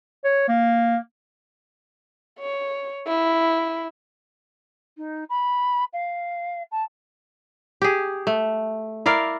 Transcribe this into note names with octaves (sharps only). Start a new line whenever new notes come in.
C#5
A#3
C#5
E4
D#4
B5
F5
A5
G4 G#4
A3
E4 A#4 D5 F5